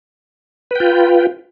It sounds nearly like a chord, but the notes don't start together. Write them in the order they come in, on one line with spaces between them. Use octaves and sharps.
B4 G5 F4